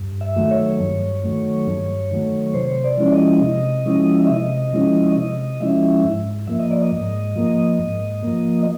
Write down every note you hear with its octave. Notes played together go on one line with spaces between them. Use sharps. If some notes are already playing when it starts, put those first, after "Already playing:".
Already playing: G2
E5
D#3 F#3 A3
C#5
G2
D#3 F#3 A3
G2
D#3 F#3 A3
C3 C5
D5
F3 G#3 C#4 E4
D#5
C3
F3 G#3 C#4 E4
E5
C3 D#5
F3 G#3 C#4 E4
C3 D#5
F3 G#3 C#4 E4 E5
G#2
F3 A#3 E5
D#5
D5
D#5
G#2
F3 A#3
G#2
F3 A#3